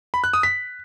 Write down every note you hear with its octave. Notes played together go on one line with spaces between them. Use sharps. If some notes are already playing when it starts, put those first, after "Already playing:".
B5
F#6
D#6
B6